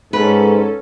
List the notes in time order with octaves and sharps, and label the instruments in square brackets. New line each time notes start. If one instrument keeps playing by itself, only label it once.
[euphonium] G#2 [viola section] C#4 A4 [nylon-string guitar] B4